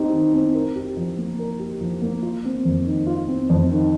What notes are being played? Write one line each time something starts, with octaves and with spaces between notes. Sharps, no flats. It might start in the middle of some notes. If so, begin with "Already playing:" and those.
Already playing: C4 D#4 G4
D#3
C4
A#4
G4
F3
A#3
A#4
G4
F3
A#3
F4
C4
F2
D#3
F4
C4
F2
D#3